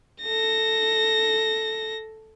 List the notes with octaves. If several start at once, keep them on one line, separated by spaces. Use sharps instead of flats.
A4 A#6